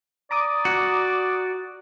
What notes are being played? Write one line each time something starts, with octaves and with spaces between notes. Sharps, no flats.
D5 A#5 D6 D#6
F#4